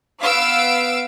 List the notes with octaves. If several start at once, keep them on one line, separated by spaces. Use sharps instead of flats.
B3 F5 E6 D7